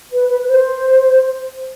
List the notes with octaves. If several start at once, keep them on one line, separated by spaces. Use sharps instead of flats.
B4
B4
B4
C5